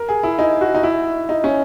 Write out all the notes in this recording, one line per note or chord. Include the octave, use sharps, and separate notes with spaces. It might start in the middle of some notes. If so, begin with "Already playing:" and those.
Already playing: A#4
G#4
E4
D#4
F#4
D#4
E4
D#4
C#4